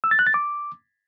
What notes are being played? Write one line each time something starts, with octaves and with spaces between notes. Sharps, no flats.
E6
A6
F#6
A6
D6